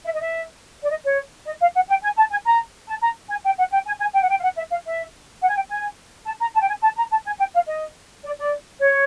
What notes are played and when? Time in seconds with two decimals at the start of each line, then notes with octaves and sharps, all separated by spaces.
0.05 E5
0.13 D#5
0.19 E5
0.83 D5
0.90 D#5
1.04 C#5
1.45 D#5
1.60 F5
1.74 F#5
1.88 G5
2.02 G#5
2.16 A5
2.30 G#5
2.44 A#5
2.87 A5
3.02 A#5
3.29 G#5
3.44 G5
3.57 F#5
3.72 G5
3.86 G#5
4.00 G#5
4.14 G5
4.21 F#5
4.29 G5
4.39 F5
4.42 F#5
4.56 E5
4.70 F5
4.85 E5
5.41 F#5
5.48 G#5
5.55 G5
5.69 G#5
6.25 A5
6.40 A#5
6.54 A5
6.61 G5
6.68 G#5
6.82 A5
6.96 A#5
7.10 A5
7.25 G#5
7.38 G5
7.53 F5
7.67 D#5
8.23 D5
8.38 D5
8.80 C#5